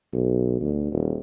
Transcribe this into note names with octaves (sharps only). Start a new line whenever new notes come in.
B1
D2
D#1